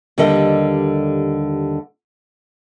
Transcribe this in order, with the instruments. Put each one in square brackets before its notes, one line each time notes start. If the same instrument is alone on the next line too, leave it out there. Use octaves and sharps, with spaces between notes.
[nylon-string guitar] D#2 D3 G3 A4 D#5